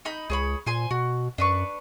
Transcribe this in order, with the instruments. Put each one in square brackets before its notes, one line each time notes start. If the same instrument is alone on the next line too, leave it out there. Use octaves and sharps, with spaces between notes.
[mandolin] D#4 B5 G6
[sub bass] C#2 [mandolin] G#4 C#5 B5
[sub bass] A#2 [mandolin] C5 G#5 C6
[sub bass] B2 [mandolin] F#4
[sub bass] F#2 [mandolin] D4 B4 C#6